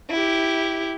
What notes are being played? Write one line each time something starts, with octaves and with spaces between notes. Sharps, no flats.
E4 G4